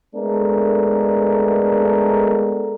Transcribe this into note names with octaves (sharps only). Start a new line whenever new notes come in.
G#3 A3 B3 D4 A4 A#4